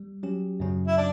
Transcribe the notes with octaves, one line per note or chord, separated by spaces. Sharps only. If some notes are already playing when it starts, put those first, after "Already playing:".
Already playing: G3
F#3 C#4 G4
F#2 C#3 F#3 C#4
E4
D4